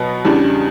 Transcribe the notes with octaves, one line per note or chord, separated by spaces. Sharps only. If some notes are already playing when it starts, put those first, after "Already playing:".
Already playing: B2 F#3 B3
E2 C#3 G3 D4